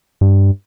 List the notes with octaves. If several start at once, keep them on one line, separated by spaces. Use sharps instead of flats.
G2